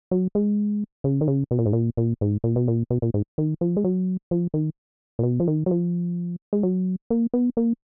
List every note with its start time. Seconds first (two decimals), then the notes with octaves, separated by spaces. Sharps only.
0.11 F#3
0.35 G#3
1.04 C#3
1.21 D#3
1.28 C#3
1.51 B2
1.59 A#2
1.66 G#2
1.73 A#2
1.97 A#2
2.21 G#2
2.44 A#2
2.56 B2
2.68 A#2
2.90 B2
3.02 A#2
3.14 G#2
3.38 D#3
3.61 F3
3.77 G#3
3.84 F#3
4.31 F3
4.54 D#3
5.19 A#2
5.23 B2
5.40 F3
5.48 D#3
5.66 F#3
5.71 F3
6.53 G#3
6.63 F#3
7.10 A#3
7.34 B3
7.57 A#3